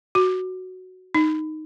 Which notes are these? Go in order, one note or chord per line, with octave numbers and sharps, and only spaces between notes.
F#4
D#4